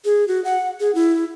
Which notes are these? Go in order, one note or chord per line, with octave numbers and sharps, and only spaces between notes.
G#4
F#4
F#5
G#4
E4